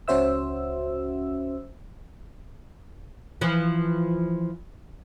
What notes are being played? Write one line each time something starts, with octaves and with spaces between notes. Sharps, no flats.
C#2 C#4 F#4 C5 E5 E6
E3 F3